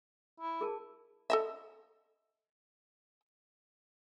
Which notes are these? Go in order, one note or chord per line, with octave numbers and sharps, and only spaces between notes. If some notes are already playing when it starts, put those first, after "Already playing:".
E4
G#4 A#4 A5
A4 D#5 E5